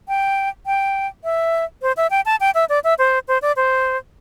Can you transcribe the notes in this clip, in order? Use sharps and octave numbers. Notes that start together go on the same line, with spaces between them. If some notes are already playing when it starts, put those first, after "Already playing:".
G5
G5
E5
C5
E5
G5
A5
G5
E5
D5
E5
C5
C5
D5
C5